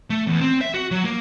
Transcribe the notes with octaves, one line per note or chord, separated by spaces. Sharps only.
A3
E2
C4
E5
F#4
F#3
A#3